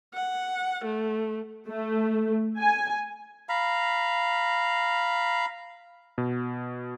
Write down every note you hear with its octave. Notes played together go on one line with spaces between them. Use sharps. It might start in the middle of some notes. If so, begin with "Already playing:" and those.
F#5
A3
A3
G#5
F5 A#5 B5
B2